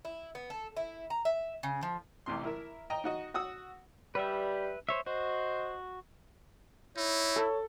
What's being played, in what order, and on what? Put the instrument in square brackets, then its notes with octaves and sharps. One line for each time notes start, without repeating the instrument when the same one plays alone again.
[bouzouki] E4
B3
A4
E4
A#5
E5
C#3
F3
[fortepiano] A1 C3 C6
E4 A#4 E5
D#5 G5 A#5
D#4 F#4 D#5
F#4 F#5 D#6 E6
[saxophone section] G3 [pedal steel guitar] B4 E5
[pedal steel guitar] C5 C#5 E5
[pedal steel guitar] F#4 [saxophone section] C5 D#5
[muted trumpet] D#4 [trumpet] E4 [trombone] C#5
[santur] A4